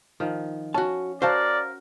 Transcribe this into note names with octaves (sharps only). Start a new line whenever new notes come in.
D#3 F3
C#4 F#4 A5
F#4 A#4 C5 D5 F5 F#5 A5